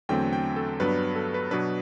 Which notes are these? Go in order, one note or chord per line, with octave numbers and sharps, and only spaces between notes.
E2 D3 F#3 A3 C4 G5
G5
A4
G2 F#3 B3 D4 B4
A4
B4
B2 F#3 B3 D4 B4